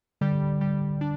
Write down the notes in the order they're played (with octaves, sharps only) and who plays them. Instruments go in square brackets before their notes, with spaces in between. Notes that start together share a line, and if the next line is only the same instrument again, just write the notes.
[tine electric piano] D3 [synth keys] G3
[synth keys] G3
D4